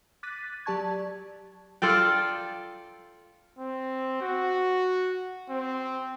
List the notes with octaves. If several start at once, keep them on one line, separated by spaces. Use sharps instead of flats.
D6 F#6 A6 B6 D#7
F#3 G4 D5 A5 C#6 G#6
F4 A4 D5 G5
C4
F#4
C4